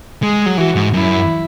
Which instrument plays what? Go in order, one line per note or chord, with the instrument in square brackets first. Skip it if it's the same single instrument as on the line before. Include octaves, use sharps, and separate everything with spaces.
[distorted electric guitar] G#3 [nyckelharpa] G#4
[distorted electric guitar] F#3
[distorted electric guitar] E3 [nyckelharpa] F#4
[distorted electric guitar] G#2
[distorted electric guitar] F#2 [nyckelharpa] E4